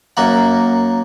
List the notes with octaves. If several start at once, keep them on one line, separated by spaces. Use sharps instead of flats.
F#2 A#3 F#5